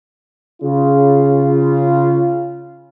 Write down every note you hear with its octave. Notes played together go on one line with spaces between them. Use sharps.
C#3 F4